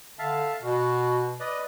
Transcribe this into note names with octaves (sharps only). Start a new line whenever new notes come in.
D3 E5 F5 A5
B2 F#4
B4 D5 D#5